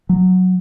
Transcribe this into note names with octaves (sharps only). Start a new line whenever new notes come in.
F#3